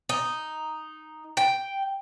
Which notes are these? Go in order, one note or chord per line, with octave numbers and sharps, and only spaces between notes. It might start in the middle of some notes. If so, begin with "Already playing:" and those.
D#4
G5